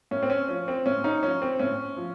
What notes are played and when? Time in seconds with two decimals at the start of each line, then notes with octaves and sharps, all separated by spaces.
0.11 A2 C#4
0.23 C4
0.30 C#4
0.49 F3 C#4
0.68 C4
0.86 A2 C#4
1.04 C#4 D#4
1.23 F3 C#4
1.42 C4
1.59 A2 C#4
1.97 F3